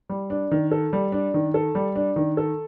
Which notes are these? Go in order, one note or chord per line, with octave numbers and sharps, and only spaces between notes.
G3
D4
D#3
A4
G3
D4
D#3
A4
G3
D4
D#3
A4